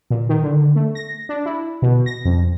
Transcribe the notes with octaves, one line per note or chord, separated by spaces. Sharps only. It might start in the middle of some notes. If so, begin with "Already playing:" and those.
A#2
D#3
D3
A3
A#6
D4
E4
B2
A#6
F2